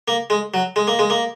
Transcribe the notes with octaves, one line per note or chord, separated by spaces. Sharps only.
A#3
G#3
F#3
G#3
A#3
G#3
A#3